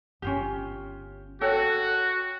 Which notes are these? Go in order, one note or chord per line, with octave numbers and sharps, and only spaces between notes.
G1 C#4 F4 G4
F#4 A4 C#5 G5